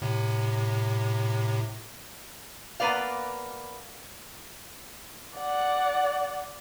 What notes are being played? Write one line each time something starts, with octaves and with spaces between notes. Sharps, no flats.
A2 C3
A#3 B3 B4 D5 F5
D5 F#5